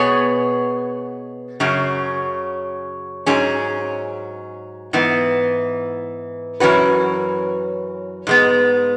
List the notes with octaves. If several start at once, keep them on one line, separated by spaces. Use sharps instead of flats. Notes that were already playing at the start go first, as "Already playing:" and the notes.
Already playing: B2 B3 G#4 C#5
F#2 C#3 F#3 C#4
G#2 F#3 C#4 G#4
G#2 E3 B3
F#2 E3 C#4 F#4 B4
G#2 G#3 B3